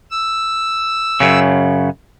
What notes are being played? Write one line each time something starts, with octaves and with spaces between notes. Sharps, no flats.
E6
F#2 C#3